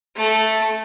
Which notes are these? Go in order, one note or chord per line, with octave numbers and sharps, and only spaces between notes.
A3 A5